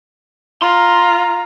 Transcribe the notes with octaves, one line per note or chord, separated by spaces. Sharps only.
F4 A#5 C6